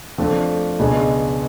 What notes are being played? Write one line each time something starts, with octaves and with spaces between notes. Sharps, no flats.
F2 F3 A3 D4
C#2 B2 G#3 D4 G#4